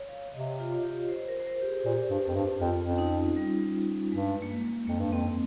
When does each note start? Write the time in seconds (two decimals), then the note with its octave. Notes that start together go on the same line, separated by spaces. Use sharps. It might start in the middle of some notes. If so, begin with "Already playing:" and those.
Already playing: C#5
0.09 F5
0.34 C3 D#5
0.59 F4
0.84 G4
1.09 C5
1.28 A#4
1.40 C5
1.47 A#4
1.62 G4
1.66 G#4
1.85 A#2 G4
2.10 G2
2.28 F2
2.35 G2
2.60 F2 F4
2.80 F2
2.89 C#4
2.98 D#4
3.36 G3
4.12 G2 G#3
4.42 A#3
4.49 G#3
4.87 F2 A#3
5.00 G2
5.12 F2 C4